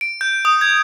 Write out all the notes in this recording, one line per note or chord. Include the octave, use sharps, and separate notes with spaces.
D7
G6
D#6
G#6